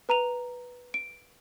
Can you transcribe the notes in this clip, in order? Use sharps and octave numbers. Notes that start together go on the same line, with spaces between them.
B4 A#5 D#7 F7
D7